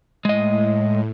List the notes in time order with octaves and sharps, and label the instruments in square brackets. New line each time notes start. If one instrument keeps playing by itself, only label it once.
[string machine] A2 [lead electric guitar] G#3 D#5